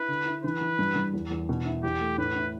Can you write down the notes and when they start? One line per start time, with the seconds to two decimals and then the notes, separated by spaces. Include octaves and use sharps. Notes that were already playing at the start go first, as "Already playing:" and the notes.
Already playing: E4 B4
0.08 D3
0.26 E4
0.44 E3 B4
0.61 E3
0.79 G2
0.96 G2
1.14 E2
1.31 E2
1.49 B2
1.65 E4
1.83 E2 G4
2.01 A3
2.18 A2 B4
2.36 E4